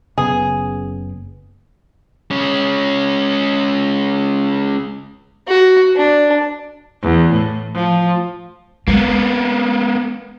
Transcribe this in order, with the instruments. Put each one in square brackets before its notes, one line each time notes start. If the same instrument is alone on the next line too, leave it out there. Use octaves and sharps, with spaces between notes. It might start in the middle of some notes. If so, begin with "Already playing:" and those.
[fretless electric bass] F#1 C#3 B3 [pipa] G#4
[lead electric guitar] G#3 C#4
[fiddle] F#4
D4
[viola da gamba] E2
A2
F3
[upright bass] G#3 [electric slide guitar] A#3 B3